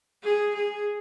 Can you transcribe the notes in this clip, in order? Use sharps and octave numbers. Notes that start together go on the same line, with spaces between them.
G#4
G#4